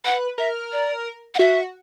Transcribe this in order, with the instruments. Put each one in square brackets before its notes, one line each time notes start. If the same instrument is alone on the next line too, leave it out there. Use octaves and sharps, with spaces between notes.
[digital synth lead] B4 [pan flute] F#5
[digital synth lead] A#4 [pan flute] E5
[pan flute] D5
F#5
[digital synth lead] F#4 [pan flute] E5